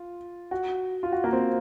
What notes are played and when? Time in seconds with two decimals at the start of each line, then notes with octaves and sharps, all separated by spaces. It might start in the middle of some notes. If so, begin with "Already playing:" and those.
Already playing: F4
0.51 F#4
1.03 F4
1.12 F#4
1.24 A#3
1.33 C4